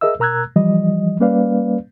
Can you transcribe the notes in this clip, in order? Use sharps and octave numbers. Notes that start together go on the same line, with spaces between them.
G#4 A#4 D#5 E5 E6
B2 A#4 A#5 E6 F#6 G#6
E3 F3 G3 D#5
G3 A#3 C#4 B4 D5 F5